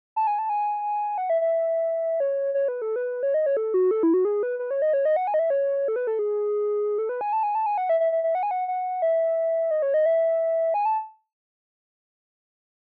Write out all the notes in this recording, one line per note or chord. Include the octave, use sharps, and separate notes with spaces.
A5
G#5
A5
G#5
F#5
E5
E5
C#5
C#5
B4
A4
B4
C#5
D#5
C#5
A4
F#4
A4
E4
F#4
G#4
B4
B4
C#5
D#5
C#5
D#5
F#5
G#5
D#5
E5
C#5
A4
B4
A4
G#4
A4
B4
G#5
A5
G#5
A5
G#5
F#5
E5
E5
E5
E5
F#5
G#5
F#5
F#5
E5
D#5
C#5
D#5
E5
G#5
A5